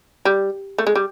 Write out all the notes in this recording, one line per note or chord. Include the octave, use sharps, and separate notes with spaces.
G3
A3
G#3
G3